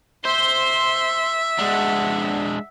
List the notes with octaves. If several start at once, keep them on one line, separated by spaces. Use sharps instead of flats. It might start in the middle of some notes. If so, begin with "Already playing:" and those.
C5 E5 C6
G#3 D4 F#5